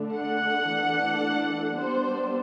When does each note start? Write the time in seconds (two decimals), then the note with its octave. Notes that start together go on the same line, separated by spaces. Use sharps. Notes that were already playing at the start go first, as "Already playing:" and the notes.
Already playing: D3 A3 D4
0.16 F#5
0.68 E3 A3 D4
1.76 G3 B3 D4 C5